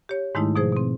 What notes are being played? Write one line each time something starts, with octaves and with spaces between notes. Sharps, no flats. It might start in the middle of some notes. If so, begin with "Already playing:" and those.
G4 C#5
G#2 D#3 G#3 A3 D#4 E4
B2 F3 G#4 C5
B2 C4